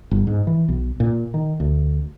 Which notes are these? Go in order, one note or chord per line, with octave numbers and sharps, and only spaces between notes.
G1
G#2
E3
B1
A#2
D#3
D2